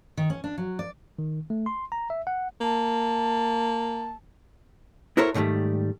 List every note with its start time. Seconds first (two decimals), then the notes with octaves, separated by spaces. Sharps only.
0.17 D#3
0.30 C#4
0.44 D4
0.58 F#3
0.79 D5
1.19 D#3
1.50 A3
1.66 C6
1.92 A#5
2.10 E5
2.27 F#5
2.61 A#3 A5
5.17 E4 F#4 A4 A#4 C5 C#5
5.34 G#2 D3 D#3 G3 A3